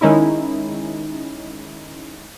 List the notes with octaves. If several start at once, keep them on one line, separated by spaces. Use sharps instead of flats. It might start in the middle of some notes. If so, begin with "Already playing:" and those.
D#3 G#3 C#4 D#4 E4